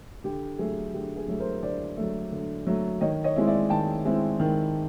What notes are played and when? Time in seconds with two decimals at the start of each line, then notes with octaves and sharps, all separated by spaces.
0.24 D3 G4
0.59 F#3 A3 G#4
0.93 D3 G4
1.16 G#4
1.28 F#3 A3
1.40 A#4 C5
1.63 D3 C5 D5
1.97 F#3 A3
2.32 D3
2.67 F#3 A3
3.01 D#3 C#5 D#5
3.24 C#5 D#5
3.36 G#3 C4 E4
3.47 D5 E5
3.70 D#3 G5 A5
4.05 G#3 C4 E4
4.40 D#3